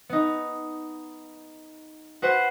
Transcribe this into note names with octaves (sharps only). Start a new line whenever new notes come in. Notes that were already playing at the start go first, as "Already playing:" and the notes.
B3 D#4
F#4 B4 C5 F#5